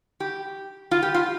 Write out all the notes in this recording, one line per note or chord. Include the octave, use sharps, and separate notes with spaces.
G4
F4
G4
F4